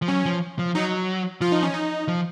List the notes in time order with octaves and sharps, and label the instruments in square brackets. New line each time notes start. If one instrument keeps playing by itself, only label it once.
[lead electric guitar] F3
[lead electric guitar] F#3 [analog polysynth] C#4
[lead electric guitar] F3
F3
[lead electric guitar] F#3 [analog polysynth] D#4
[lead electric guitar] F3 [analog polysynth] F4
[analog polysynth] D#4
C#4
D#4
[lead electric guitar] F3